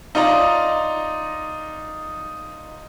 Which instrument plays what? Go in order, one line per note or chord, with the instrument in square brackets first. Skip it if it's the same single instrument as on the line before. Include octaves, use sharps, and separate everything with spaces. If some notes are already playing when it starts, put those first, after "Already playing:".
[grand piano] D#4 F4 D5 D#5 A#5